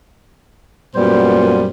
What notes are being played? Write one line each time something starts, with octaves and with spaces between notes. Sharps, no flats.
F#2 A#2 G3 B3 C5